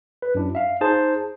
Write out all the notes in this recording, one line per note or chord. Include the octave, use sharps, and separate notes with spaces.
B4
F#2 D4 E4
E5 F5
D#4 G#4 C5 A5